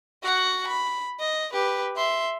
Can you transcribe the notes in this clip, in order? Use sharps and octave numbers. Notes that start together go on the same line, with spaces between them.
F#4 F#5
B5
D#5
G4 B4
E5 C6